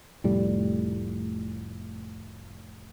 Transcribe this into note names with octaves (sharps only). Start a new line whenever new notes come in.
F1 A2 G3